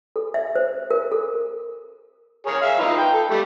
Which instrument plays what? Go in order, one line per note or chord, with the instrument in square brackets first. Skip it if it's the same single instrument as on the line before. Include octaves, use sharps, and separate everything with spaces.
[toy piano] A4
E5
C5
A#4
A4
[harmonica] G#4 A#4 C#5
E5 F5
D#4 F4 B4
G5
A4
G3 A3